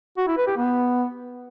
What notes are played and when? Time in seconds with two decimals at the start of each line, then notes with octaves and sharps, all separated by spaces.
0.17 F#4
0.27 E4
0.37 B4
0.47 G4
0.57 B3